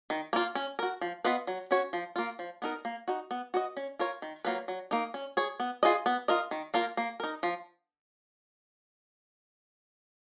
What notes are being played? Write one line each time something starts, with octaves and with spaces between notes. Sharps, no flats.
D#3
A#3 F4
C#4
F#4 A#4
F3
B3 F4 B4 D#5
F#3
C#4 F#4 C#5
F3
A#3 F4
F3
B3 D#4 A#4
A#3
D#4 F#4
B3
F#4 B4 D#5
C#4
F4 A#4 C#5
D#3
F#3 A#3 F4 B4
F#3
A#3 D#4
C#4
G#4 C#5
B3
F4 G#4 B4 D#5
B3
F4 A#4 D#5
D#3
A#3 F4 A#4
A#3
D#4 A#4
F3